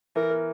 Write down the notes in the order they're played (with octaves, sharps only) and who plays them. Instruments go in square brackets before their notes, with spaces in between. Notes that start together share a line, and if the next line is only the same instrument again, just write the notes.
[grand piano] E3 [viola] A#4
[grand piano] A#4